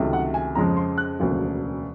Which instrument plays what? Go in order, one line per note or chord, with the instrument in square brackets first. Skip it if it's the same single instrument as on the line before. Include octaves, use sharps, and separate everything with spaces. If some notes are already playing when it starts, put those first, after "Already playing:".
Already playing: [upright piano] C#2 C3 D#3 F#3 A3
F#5
G#5
F2 C#3 F3 G#3 A#5
C6
F#6
E1 D2 C#3 F3 A#3